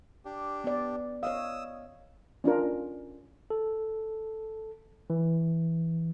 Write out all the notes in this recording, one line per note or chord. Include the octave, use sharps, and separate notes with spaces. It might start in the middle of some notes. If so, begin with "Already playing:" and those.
D4 G4
B3 D5
C#5 D#5 F5 D#6 E6
C#4 D4 F4 A#4
A4
E3